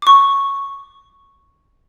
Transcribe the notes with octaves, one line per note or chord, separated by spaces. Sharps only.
C#6 D6